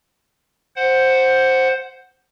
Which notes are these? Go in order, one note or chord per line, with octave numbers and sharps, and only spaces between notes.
C5 F#5